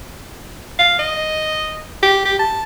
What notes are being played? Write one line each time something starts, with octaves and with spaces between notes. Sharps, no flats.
F5
D#5
G4
G4
A5